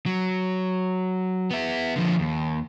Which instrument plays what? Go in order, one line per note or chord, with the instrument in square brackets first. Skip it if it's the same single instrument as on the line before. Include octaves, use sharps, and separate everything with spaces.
[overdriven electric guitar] F#3
B3 E5
D3 F3
D#2